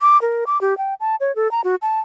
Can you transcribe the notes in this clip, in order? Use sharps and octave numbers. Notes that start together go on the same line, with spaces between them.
D6
A#4
D6
G4
G5
A5
C#5
A4
A#5
F#4
A5